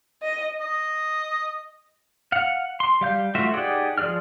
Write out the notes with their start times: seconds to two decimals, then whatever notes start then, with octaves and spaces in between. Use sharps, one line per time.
0.22 D#5
0.60 D#5
2.32 F5 F#5
2.80 C6
3.01 G3 F5 G6
3.35 A3 F4 F#4 C5 E5
3.54 D#4 G4 G#4 D5 F#5
3.98 F3 F4 G#4 D5 F6